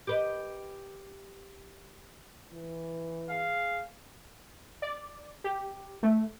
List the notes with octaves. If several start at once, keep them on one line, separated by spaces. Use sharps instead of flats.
G4 B4 D#5
E3
G#4 F5
D5
G4
A3